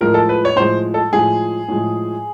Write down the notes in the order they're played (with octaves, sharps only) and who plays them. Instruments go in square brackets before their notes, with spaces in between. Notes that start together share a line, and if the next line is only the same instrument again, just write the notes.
[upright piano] A2 F3 G#3 [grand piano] A#4
[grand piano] A4
B4
C#5
[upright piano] A2 F3 G#3 [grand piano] C5
[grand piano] A4
[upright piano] A2 F3 G#3 [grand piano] G#4
[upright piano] A2 F3 G#3